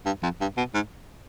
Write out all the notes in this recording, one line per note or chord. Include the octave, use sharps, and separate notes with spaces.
G2
F2
G2
B2
G#2